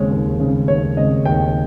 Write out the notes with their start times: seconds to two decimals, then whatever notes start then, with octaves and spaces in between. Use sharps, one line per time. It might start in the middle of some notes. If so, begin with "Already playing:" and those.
Already playing: D#2 C#3 G#3 C4 C#5
0.11 D#2
0.40 C#3 G#3 C4
0.68 D#2 C#5
0.97 C#3 G#3 C4 D#5
1.25 D#2 G5